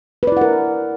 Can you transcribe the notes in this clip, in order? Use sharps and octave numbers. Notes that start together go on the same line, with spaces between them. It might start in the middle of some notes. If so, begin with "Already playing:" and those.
E4 A#4 B4 D5 F#5